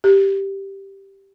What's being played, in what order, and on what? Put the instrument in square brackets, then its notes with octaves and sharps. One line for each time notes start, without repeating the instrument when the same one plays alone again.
[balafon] G4